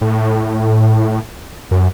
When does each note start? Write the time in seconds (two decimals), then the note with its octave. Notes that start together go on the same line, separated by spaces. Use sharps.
0.01 A2
1.71 F#2